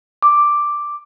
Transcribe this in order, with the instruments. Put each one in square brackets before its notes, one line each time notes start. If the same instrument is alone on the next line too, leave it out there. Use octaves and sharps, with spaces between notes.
[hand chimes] D6